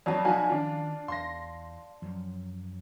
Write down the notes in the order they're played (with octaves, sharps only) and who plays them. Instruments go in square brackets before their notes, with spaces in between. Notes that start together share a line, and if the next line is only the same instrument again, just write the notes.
[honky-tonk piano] F2 F#3 [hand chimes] D5 A5
[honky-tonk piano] B1 F#4 G#5 [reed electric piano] F3 F5
[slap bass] D#3 C#4 [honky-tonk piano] D4 F4
[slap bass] E2 [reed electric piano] F5 [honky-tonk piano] C6 A#6
[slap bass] F#2 F#3 [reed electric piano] F3